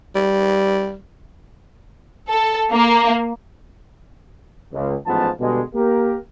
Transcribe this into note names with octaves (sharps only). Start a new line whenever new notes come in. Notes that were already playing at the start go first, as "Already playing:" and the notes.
G3
A4
A#3
C#2
A1 G#2 F3 B3 F4 A5
B2 D3 G3 G#3
A#3 G4 A#4